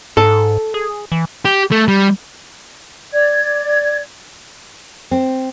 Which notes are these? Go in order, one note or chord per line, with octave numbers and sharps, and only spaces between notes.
G#2 A4
G#4
E3
G4
A3
G3
D5 G#6
C4